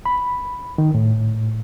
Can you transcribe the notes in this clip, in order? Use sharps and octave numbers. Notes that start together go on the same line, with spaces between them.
B5
D#3
A2